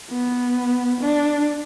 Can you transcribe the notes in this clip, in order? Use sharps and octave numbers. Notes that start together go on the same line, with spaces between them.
B3
D4